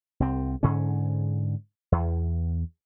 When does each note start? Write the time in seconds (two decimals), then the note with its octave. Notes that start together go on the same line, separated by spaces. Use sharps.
0.20 C2 C4
0.63 G#2 D3 C#4
1.92 E2